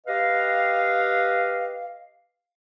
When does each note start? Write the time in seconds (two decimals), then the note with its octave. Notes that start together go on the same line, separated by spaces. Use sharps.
0.07 G4 B4 D#5 F5